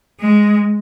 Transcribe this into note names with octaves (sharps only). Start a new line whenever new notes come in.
G#3